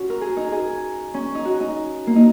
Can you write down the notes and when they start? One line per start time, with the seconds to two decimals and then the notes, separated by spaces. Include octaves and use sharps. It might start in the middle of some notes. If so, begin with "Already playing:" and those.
Already playing: C#4 F#4
0.10 A#4
0.21 G#4
0.37 D#4
0.52 G#4
1.14 C#4
1.35 D#4
1.45 F#4
1.60 D#4
2.07 A#3
2.16 D#4